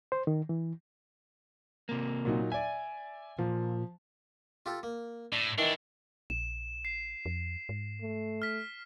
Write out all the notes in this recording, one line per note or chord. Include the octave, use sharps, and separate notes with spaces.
C5
D#3
E3
C3 A#3
A#2 F#3 D#4
D5 E5 G#5
A#2 F3
F4 G4 A4
A#3
A2 D4
D#3 E3 D4 E4
A#1 E7
C7
F2
G#2
A3
F6 B6